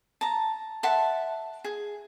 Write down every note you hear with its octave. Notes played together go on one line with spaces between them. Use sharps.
A5 A#5
E5 F#5 A5 C6
G#4